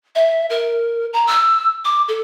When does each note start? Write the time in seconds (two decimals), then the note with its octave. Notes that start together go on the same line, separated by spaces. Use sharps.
0.15 E5
0.50 A#4
1.13 A#5
1.27 E6
1.85 D6
2.08 A4